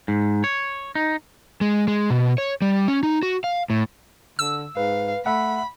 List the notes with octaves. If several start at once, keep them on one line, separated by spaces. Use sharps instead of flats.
G#2
C#5
D#4
G#3
G#3
B2
C#5
G3
C#4
D#4
F#4
F5
A2
D3 E6
G#2 B4 F5
A3 E5 F#5 B5